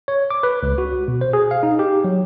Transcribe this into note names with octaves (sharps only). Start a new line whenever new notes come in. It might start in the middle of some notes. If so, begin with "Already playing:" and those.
C#5
D6
B4
C#2
F#4
B2
C5
G#4
F5
D#4
G4
F#3